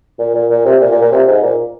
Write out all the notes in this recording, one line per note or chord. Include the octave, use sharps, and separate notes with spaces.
A#2
A#2
A#2
C3
A#2
A#2
A#2
C3
G#2
A#2